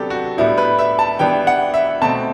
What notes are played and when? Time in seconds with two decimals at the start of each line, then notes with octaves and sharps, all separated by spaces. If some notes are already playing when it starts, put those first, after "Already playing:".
Already playing: C3 F#3 B3 D4 G4 A4
0.10 F#4
0.37 A2 G3 B3 D4 E4
0.58 B4
0.79 E5
0.99 A5
1.19 E3 G3 B3 D4 G5
1.47 F#5
1.74 E5
2.01 B2 A3 C4 A5